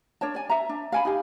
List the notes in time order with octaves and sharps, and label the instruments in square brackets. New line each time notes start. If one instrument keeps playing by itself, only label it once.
[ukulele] D4 A#4 C#5 A5
D5 G#5
E5 A#5
D4
F5 G#5 B5
D#4 G4 F5